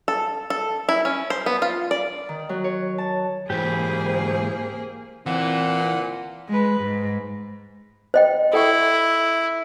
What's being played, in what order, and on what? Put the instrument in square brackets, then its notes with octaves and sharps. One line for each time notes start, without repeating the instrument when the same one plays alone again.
[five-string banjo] A4
A4
E4
C#4
C5
B3
F4
D5
[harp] D#3
F#3
C#5
A5
[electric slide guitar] G#2 E3 [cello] A#3 G#4 [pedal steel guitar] G4 G5 B5 [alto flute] C5
[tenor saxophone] A#2 [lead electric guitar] E3 [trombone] C4 [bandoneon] F#5
[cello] G#3 B4
G#2
[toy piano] C5 D#5 G5
[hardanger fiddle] E4 [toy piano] A4 G5 C#6